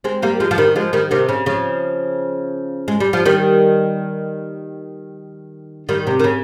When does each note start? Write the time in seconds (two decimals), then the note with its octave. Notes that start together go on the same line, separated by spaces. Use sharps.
0.04 G#3 C4
0.22 G3 A#3
0.40 F3 G#3
0.51 F3
0.58 D#3 G3
0.76 F3 G#3
0.93 D#3 G3
1.11 C3 D#3
1.29 C#3
1.46 C#3 F3
2.88 G#3
3.00 G3
3.13 F3
3.25 D#3 G3
5.89 D#3 G3
6.07 C3
6.19 D#3
6.24 C#3